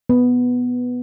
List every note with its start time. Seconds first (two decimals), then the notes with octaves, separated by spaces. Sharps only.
0.09 B3